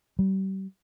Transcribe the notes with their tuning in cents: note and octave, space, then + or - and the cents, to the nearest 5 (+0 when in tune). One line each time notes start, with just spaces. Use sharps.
G3 -35